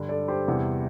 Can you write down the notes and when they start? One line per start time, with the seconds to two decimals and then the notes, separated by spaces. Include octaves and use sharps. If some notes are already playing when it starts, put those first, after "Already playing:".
Already playing: G2 D3 G3
0.09 A4 D5
0.28 G4 C5
0.47 E2 C3 E3 G3